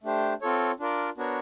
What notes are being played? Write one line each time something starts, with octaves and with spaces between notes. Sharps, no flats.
A3 D4 G4 C5
C4 F4 A4 C#5
D4 F4 A#4 D5
B3 D4 F#4 A#4 C#5